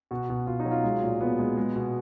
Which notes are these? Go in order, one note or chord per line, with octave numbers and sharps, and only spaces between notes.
B2 F#4
B2
B2 F4
D#4
F#3
F4
G#3
A#2
A#2 B3
G#3
G#3
B2